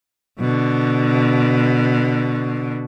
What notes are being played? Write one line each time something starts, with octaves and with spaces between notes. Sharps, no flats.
B2 D3